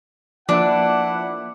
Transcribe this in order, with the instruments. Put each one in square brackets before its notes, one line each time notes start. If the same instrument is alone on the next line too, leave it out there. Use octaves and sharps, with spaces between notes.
[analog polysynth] F3 A#3 E5 [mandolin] D4 [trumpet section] E4 B4 F#5 [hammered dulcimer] D5